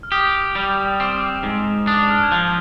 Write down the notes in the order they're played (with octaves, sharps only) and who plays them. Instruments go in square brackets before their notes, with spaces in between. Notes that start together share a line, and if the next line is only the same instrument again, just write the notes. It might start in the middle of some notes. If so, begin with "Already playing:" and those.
[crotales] F6
[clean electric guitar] G4 [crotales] D#6
[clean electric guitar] G3
[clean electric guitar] C4 [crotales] D6
[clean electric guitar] G#2
[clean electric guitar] D4 [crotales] D#6
[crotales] F6
G#6
[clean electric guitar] F3 [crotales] G6